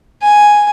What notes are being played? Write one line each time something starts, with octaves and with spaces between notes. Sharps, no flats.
G#5